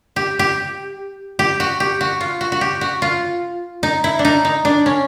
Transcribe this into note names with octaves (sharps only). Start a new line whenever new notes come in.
G4
G4
G4
F#4
G4
F#4
F4
F#4
F#4
G4
F#4
F4
D#4
E4
D4
D#4
D#4
D4
C#4